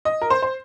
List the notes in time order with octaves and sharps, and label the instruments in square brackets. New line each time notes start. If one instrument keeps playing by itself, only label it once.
[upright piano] D#5
A#4
C5
C5